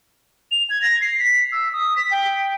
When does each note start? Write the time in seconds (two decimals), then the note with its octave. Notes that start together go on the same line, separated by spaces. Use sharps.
0.51 F7
0.70 G#6
0.82 A#6
1.01 C7
1.19 B6
1.52 E6
1.73 D#6
1.96 B6
2.11 G5